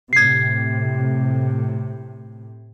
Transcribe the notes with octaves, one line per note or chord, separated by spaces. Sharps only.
A2 C3 G#6 C7